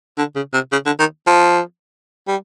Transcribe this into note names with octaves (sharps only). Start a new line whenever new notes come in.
D3
C#3
C3
C#3
D3
D#3
F3
G3